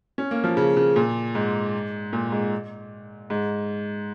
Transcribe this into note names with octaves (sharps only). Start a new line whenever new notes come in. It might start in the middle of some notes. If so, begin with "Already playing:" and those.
C#4
A#3
F3
C#3
C#3
A#2
G#2
A#2
G#2
G#2